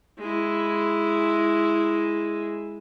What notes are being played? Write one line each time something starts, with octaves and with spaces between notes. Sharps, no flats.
G#3 E4